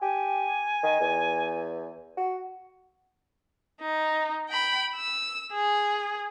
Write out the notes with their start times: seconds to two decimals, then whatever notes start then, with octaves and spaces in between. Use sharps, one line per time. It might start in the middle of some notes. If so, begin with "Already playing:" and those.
0.02 G4 G#5
0.83 D#3
1.01 E2
2.17 F#4
3.81 D#4
4.49 G5 B5
4.95 E6
5.52 G#4